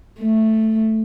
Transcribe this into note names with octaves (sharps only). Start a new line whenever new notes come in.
A3